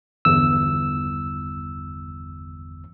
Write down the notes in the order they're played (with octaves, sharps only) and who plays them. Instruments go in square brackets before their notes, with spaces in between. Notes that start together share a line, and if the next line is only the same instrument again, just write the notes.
[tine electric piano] G1 E2 E6